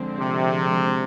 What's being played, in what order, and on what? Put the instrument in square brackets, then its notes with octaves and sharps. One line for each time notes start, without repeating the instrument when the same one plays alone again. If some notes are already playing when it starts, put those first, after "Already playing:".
Already playing: [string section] D3 F3 G#3 C4
[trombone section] C3